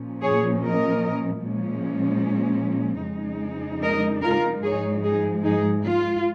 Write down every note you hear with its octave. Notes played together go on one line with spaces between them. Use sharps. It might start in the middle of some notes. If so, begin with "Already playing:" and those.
Already playing: A#2 F3 C#4
G#4 C#5
A#4 D#5
A#2 F3 G#3 C#4
F2 C#3 G#3 D#4
A#4 D#5
F4 A#4
G#2 F3 G#3 D#4 G#4 C#5
D#4 G#4
D#4 G#4
F4